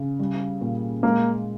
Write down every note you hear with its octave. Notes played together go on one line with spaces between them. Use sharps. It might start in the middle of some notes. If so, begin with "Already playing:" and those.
Already playing: C#3
G3
A#2
G#3 A#3